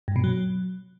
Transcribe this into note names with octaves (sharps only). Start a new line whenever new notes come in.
G2
B2
F#3